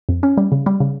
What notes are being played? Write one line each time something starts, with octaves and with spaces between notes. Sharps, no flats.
F2
C#4
G3
C#3
G3
C#3